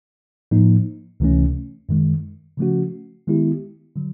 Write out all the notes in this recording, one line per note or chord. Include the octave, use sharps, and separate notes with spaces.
A2 F3 A#3 D#4
C#2 C3 E3 A3 C#4
F#2 D#3 G#3
C#3 F3 A3 C#4 F#4
D#3 G#3 B3 E4 G4
D3 F#3